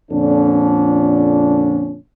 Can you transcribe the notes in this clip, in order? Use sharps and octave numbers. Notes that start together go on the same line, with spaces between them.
F2 A#2 D3 C#4 D4